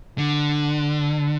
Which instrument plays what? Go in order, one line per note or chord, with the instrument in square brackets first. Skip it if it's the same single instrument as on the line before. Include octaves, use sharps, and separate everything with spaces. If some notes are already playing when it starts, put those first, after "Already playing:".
[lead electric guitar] D3